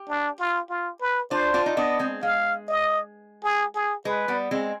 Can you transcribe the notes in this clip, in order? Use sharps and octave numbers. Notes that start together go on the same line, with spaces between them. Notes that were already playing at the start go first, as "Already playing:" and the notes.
Already playing: G4
D4
F4
F4
B4
D4 F4 C5
D4 F4
D#4
B3 D4 D#5
G#3 C4
G#3 F5
D#5
G#4
G#4
G#3 B4
G3 B3
G#3 C4